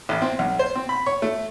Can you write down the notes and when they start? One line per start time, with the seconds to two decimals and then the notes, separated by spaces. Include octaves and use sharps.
0.09 A1
0.22 C4
0.39 B1
0.59 C5
0.75 C4
0.89 B5
1.06 C#5
1.22 A3